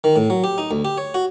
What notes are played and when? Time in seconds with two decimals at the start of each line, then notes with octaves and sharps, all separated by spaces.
0.04 D#3
0.16 A2
0.30 F#3
0.44 G4
0.58 D#4
0.71 D2
0.85 G4
0.98 C#5
1.14 F#4